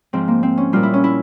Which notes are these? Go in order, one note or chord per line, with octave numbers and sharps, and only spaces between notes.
G#2 F3 C4
A#3
C4
C#4
A#2 G3 F4
E4
C#4
E4